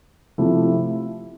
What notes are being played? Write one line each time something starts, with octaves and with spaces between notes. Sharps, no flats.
C3 F3 A3 E4